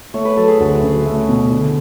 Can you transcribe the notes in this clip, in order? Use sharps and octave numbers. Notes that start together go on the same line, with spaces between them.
A3 C#5
B4
F#3 A4
G#4
D2 F#4
C#3
A3
B2
D3